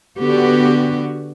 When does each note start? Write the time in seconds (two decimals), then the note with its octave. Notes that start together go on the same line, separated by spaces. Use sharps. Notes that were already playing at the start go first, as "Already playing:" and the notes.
0.18 D3 B3 F#4 G4